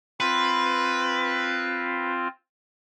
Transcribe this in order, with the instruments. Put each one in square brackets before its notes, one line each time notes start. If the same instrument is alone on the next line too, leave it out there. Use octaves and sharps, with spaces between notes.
[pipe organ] C4 F4 [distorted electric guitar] B4